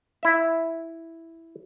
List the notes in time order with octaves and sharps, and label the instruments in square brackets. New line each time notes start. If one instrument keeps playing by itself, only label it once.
[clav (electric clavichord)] E4 E5